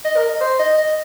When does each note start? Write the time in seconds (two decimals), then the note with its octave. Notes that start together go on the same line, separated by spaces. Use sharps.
0.05 D#5
0.16 A#4
0.29 D#5
0.41 C5
0.59 D#5
0.78 D#5